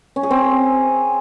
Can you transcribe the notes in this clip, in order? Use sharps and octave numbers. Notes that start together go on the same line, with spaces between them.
C#4
G#4
C4